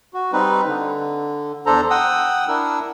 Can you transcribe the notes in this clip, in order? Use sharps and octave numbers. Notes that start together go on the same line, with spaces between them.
F#4
G3 C4 D#4 B4
D3
E2 D4 A4 C5 A#5
F#5 G5 D#6 E6
D4 E4 A#4 E6